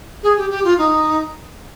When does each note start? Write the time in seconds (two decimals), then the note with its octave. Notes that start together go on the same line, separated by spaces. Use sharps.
0.23 G#4
0.37 G4
0.50 G4
0.64 F4
0.78 D#4